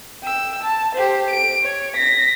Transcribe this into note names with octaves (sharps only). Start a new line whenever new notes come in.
G5 E6
A5
G4 C5
D7
C#5
A#6 B6